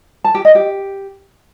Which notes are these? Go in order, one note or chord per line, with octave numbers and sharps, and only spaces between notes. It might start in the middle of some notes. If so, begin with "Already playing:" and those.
A5
G4
D#5
G4